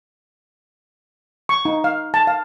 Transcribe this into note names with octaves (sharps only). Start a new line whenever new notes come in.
C#6
D#4
F5
A5
F5